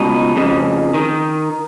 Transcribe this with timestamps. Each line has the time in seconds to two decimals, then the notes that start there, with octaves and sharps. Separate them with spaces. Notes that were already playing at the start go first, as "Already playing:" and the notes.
Already playing: C#2 B2 D#4
0.36 F2 C#3
0.94 D#3